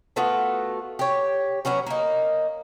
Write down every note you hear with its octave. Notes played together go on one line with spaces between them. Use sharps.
A3 B3 F4 F#4
G4 C#5
F#3 B3 C#4 F#4
A#3 D#4